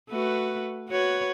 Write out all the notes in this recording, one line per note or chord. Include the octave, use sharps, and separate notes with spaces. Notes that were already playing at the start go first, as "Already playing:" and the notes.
A3 F#4 B4
F#4 B4 C#5